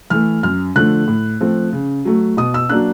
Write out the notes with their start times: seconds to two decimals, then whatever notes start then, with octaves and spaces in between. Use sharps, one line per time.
0.10 E3 A3 F6
0.43 F#2 F6
0.76 D3 F3 A3 F#6
1.08 A2
1.41 F3 A3 C4
1.73 C#3
2.05 F#3 A3
2.37 B2 D#6
2.54 E6
2.69 F#3 A#3 D4 F#6